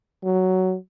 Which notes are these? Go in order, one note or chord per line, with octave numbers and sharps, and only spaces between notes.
F#3